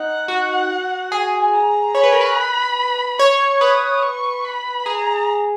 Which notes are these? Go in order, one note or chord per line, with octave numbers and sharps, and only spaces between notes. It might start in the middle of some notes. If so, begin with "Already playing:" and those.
Already playing: D#4 F#5
F#4
G#4 G#5
A#5
C#5 B5
B4
A#4
B4
C#5 C#6
B4 D#6
C#6
B5
G#4 A#5